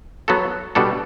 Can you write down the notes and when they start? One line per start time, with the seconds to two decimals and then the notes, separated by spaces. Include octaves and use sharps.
0.28 F#3 B3 F#4 A4
0.75 B2 G3 D4 F#4 A4